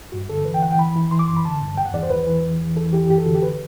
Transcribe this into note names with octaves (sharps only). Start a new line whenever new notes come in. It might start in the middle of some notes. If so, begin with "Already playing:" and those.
G2 F#4
D3 A4
E3 B4
G5
E3 F#5
G5
E3 B5
E3
E3 C6
D6
F#2 C6
B5
D3 A5
G2
E2 G5
F#5
E2 D5
C5
E3 B4
E3
E2
E2
E3 A4
E3 G4
F#2 G4
A4
D3 F#4
G4
B4